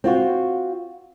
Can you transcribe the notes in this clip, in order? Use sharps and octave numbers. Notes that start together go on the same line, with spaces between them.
C4 F4 F#4